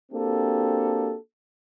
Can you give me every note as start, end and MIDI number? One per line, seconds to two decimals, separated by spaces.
0.12 1.15 58
0.12 1.15 60
0.12 1.15 62
0.12 1.15 66
0.12 1.15 67
0.12 1.15 69